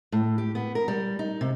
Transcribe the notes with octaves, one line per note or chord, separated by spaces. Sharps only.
A2
G4
B3
A#4
G3
D#4
C3